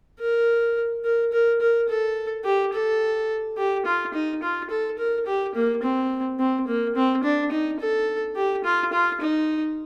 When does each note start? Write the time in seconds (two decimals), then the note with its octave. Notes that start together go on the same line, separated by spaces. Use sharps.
0.20 A#4
1.04 A#4
1.32 A#4
1.61 A#4
1.89 A4
2.45 G4
2.73 A4
3.57 G4
3.86 F4
4.14 D#4
4.43 F4
4.70 A4
4.98 A#4
5.26 G4
5.55 A#3
5.83 C4
6.39 C4
6.68 A#3
6.95 C4
7.23 D4
7.51 D#4
7.80 A4
8.36 G4
8.64 F4
8.92 F4
9.21 D#4